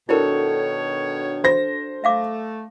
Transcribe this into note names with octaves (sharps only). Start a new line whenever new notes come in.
B2 D#3 D4 E4 F#4 A4 A#4 C#5
C5 A#6
A3 E5 F5 D6